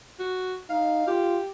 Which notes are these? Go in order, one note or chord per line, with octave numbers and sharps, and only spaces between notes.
F#4
D#4 F5
F4 G4